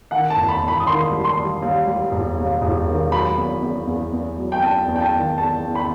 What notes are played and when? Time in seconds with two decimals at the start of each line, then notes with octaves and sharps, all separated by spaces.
0.11 D#3 F#5
0.30 A5
0.37 E1
0.49 B5
0.62 E1
0.68 B5
0.80 D#6
0.87 D#3 C6
1.11 G3
1.24 C6
1.38 G3
1.62 D#2
1.87 G3
2.12 E1
2.37 D#2
2.62 E1
2.87 D#3
3.12 F#3 B5
3.38 E2
3.62 E2
3.87 E2
4.13 E2
4.38 F#3
4.52 G5
4.62 E2 A5
4.88 E2
4.96 G5
5.00 A5
5.13 D#3
5.38 E2 A5
5.64 E2
5.75 B5